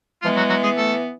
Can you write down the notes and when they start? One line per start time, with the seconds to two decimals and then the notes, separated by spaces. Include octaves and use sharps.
0.23 E3 F3 G#3 B3 F4
0.37 F#3 F#4
0.50 F#3 F#4
0.64 G#3 G#4
0.77 A3 A4